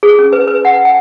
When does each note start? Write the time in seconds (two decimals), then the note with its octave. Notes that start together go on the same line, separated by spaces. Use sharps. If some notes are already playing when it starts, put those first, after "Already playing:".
0.03 G#4
0.19 C#4
0.33 B4
0.48 B4
0.65 F#5
0.85 G5